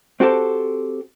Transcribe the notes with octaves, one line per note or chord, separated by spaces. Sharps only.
C4 F#4 G4 A4 C5